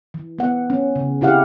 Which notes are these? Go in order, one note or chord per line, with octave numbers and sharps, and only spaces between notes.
E3
B3 F#5
C#4
C#3
C3 E4 G4 F5 F#5